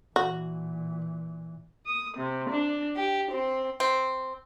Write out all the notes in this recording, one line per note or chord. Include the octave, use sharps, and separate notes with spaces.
A#2 E3 F#4
D#6
C3
D4
G4
C4
C4